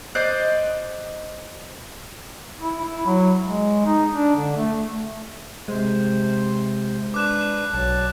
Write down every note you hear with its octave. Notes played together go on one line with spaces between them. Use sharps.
C5 D5 D#5 F#6
E4
E4
F#3
G#3
D#4
D4
D3
A3
C3 G#3 C5
D4 B4 D6 F#6 E7
B1 F#3 A5